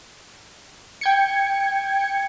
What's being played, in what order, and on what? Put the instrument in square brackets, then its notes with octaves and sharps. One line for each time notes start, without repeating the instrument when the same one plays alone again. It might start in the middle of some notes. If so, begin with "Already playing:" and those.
[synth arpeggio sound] G5 G#6 C#7